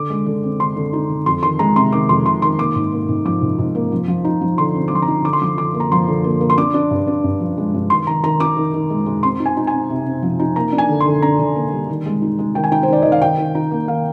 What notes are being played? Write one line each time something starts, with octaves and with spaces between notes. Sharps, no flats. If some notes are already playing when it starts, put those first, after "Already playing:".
Already playing: D3 D6
G#3
D3
C4
D3 C6
D3
D#4
D3
F2 C6
D#3 C6
G#3 A#5
C3 C6
D#3 D6
F2 C6
C3 C6
D#3 C6
A#3 D6
G#2
A#3
G#2
F3 D6
G#2
G#2
A#3
F3
F3
D#4
F3
D3 C6
C4
D6
F3 C6
A#5
D#4
D3 D6
C6
F3 D6
D3 D6
A#3
A#5
F3 C6
D3
A#3
A#3
C6
D4 D6
D4
G2
D4
G2
F3
G#3
G2
D#3 C6
D#3 A#5
D#3 A#5
D#4 D6
D#3
D#3
G#3
G#3
C4 C6
D#4
G#5
D#4
G#5
C4
C3
C4
F3
D#4
A#3 A#5
D4
G#5
D3
C6
D3
D4 A#5
D3
A#3
G3
D#3
G#3
D#4
G#3
D#3 G5
G#5
D#4 G5
C5
D#3 D5
D#3 D#5
F5
D#3 G5
D#3
D#4
A#3
D#3 F5